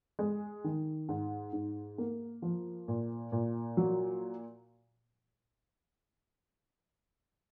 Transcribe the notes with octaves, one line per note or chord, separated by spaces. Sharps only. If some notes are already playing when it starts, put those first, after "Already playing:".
G#3
D#3
G#2
G#2
A#3
F3
A#2
A#2
F#3